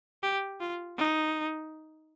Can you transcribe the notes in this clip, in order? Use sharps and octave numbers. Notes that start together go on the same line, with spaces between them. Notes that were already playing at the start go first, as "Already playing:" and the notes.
G4
F4
D#4